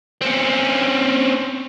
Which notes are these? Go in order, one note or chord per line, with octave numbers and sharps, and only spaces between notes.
C4 C#4